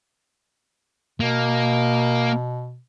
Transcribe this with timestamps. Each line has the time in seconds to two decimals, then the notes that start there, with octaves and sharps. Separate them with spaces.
1.20 B2 A#3